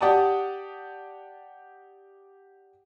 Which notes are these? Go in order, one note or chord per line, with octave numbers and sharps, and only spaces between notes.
G4 D5 F#5 A5 D#6